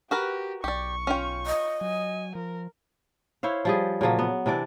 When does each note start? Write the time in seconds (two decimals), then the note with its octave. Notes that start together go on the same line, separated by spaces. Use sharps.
0.11 F#4 G4 A#4 B4
0.64 B1 G4 D5 C#6
1.07 C#4 F4 G5
1.46 D#5
1.81 F#3 G#5
2.35 F3 A#4
3.43 E4 C5 C#5 F5
3.65 F3 G3 G#4
4.01 A#2 C#3 F3 F#3
4.19 B3
4.46 C3 E3 D4 D5